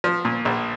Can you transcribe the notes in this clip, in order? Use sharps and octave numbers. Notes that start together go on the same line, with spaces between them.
F3
A#2
A#1